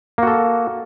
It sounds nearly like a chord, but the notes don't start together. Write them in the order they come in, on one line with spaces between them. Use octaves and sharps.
A#3 F#4 A4